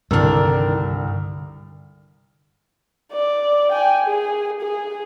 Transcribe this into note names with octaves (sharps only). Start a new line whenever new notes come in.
C2 G2 D3 D#3 D4 E6 F6
D5
G5 G#5
G#4
G#4